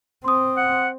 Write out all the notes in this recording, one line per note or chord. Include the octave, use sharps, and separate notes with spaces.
C4 C6 D#6
F#5